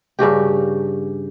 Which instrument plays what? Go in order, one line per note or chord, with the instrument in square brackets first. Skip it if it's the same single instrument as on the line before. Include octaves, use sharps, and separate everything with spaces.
[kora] G2 C#3 F#4 G4